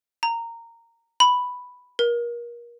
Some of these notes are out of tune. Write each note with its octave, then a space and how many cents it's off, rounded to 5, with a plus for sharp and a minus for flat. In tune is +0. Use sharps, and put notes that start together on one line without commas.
A#5 -15
B5 +0
A#4 +30